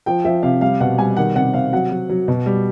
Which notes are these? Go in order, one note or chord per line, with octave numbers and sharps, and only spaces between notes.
F3 G5
F3 E5
C3 F5
G3 F5
B2 F#5
G3 G#5
D#3 F#5
C3 F#5
C3 F5
F#3 F#5
F#3
F#3
B2
G3